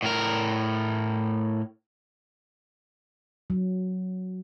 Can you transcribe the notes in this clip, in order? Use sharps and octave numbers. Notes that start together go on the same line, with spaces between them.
A2 A#4
F#3